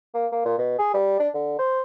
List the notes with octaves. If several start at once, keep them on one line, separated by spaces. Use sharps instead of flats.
A#3
A#3
A#2
B2
G#4
G3
D4
D3
C5